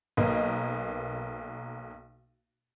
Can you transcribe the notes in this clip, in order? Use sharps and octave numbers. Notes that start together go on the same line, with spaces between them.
B1 A#3 B4 D#5